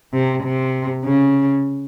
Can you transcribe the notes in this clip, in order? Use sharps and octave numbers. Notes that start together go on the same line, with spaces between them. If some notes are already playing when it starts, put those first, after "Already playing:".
C3
C3
C#3